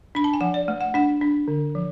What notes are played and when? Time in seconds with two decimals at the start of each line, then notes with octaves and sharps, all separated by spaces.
0.15 D4 B5
0.24 A5
0.34 G#5
0.41 F3 F#5
0.54 D5
0.68 A3
0.81 F#5
0.94 D4 F#5
1.21 D4
1.48 D3
1.75 F3